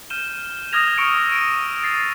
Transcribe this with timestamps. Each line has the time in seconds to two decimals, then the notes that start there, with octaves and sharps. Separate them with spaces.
0.10 F6 G6 D#7 E7 G7
0.72 D6 D#6 F6 G#6 A#6 F7
0.98 C#6 E6 F6 C#7 D7
1.32 D7 D#7
1.83 A6 C7